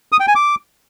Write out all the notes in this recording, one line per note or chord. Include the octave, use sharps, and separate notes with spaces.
D#6
G5
G#5
D6